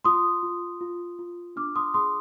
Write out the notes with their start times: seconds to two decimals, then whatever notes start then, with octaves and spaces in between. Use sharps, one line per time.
0.04 F4 C6 D#6
0.43 F4
0.81 F4
1.19 F4
1.56 D4 D6 F6
1.76 C6 D#6
1.94 G#4 C6 D#6